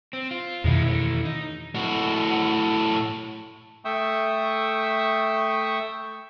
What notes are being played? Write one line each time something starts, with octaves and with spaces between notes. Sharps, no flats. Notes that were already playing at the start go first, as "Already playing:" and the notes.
C4
F4
F2 B2 D#3 G#3 E4
E3 A3
D#4
A2 F#4
A3 E5 G5 C#6 D#6 E6